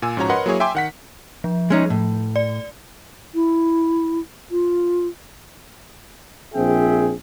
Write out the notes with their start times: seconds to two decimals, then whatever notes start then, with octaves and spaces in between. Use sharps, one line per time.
0.02 A#2 G#5 E6
0.17 G#2 F3 C#4 F#4 C#5 A#5
0.29 A#4 B4 C#5 D#5 F#5 C6
0.46 F#3 A#3 E4 G#4 C#5
0.60 E5 G5 G#5 C6 D6
0.75 D#3 F#5 B6
1.44 F3
1.70 G#3 C#4 D#4
1.90 A2
2.36 D5
3.34 E4
4.51 F4
6.54 A#1 C4 F4 G#4 E5 G5